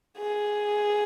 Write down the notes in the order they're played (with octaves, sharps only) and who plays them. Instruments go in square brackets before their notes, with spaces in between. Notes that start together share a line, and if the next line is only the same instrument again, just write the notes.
[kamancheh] G#4